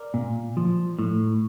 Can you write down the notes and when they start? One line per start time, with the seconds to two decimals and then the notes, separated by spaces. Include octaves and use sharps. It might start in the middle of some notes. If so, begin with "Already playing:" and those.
Already playing: A#4 D5
0.14 A#2
0.57 F3
0.99 A2